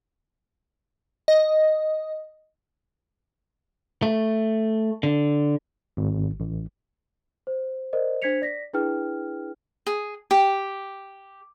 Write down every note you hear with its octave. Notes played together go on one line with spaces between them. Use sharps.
D#5
A3
D3
G#1
A1
C5
A#4 C5 D5 D#5
D4 C5 G#6 B6 C#7 F7
D5 A#6 B6
D4 E4 G#4 B4 G5 F6
G#4
G4